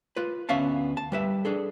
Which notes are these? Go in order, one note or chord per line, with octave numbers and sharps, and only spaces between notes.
F4 B4
D2 B3 C#4 E5 F5 A5
A5
G3 B4 E5
D4 G#4 A4